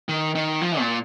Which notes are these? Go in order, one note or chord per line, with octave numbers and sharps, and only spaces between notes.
D#3
D#3
F3
A#2